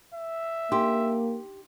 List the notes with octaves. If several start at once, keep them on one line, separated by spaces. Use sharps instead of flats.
E5
A#3 D4 D#4 G4 C6